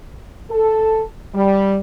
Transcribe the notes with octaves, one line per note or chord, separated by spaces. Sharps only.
A4
G3